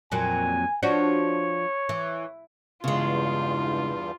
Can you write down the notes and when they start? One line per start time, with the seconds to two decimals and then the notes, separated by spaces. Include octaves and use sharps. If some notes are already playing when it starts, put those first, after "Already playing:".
0.12 F2 A#2 F#3 G#5
0.83 F3 D4 F#4 C#5
1.89 E3
2.84 E2 G2 C#3 G#3 F4